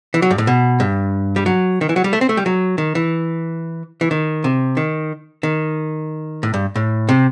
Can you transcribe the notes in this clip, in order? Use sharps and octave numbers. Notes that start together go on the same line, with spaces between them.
E3
F#3
G2
A2
B2
G2
G3
F#3
D#3
E3
F#3
G3
A3
C4
A3
G3
F#3
D#3
E3
E3
D#3
C3
D#3
D#3
A2
G2
A2
C3